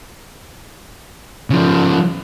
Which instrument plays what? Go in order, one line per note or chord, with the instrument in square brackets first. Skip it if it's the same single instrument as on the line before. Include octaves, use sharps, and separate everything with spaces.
[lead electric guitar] C#3 F3